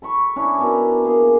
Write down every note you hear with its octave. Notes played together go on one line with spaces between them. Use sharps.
A4 B5 C#6
C#4 D4 E4
B2 D4 A4 A#4
A#3 G#4